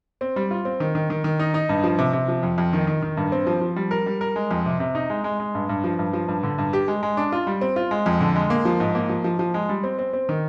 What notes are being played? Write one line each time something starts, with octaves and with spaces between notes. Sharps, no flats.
C4
G3
F4
C4
D#3
D#3
D#3
D#3
D#4
D#4
G2
F3
C3
C3
F3
F2
F2
D#3
D#3
D#3
G2
C4
F3
F3
G3
A#4
G3
A#4
G#3
F2
C3
C3
D#4
G#3
G#3
G#3
G2
G2
F3
G2
F3
G2
D3
G2
G4
G#3
G#3
D4
F4
G3
C4
F4
G#3
F2
D3
G#3
A#3
F3
G#2
A#3
F3
F3
F3
G#3
G3
C4
C4
C4
D#3